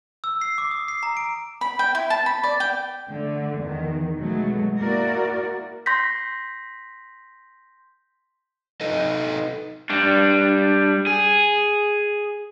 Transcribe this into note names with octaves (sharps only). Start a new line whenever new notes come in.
E6
C7
D6
D#6
C7
A#5
D7
B5
G5
E4
A5
B5
D5
G5
D3 A3
E2 D#3
B2 F#3 G#3 A3
A#3 E4 F#4 A#4 D5
C6 G6 A#6 B6
D#4 A4 B4 D#5
G3 D4
G#4